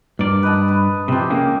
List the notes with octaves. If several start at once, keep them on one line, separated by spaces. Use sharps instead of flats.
G2 A#4 D5
B4 D#5 A5
B4
C3 F3 C4 G4
C#2 C#3 A#3